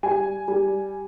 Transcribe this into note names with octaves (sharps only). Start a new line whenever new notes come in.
G3 G#5
G3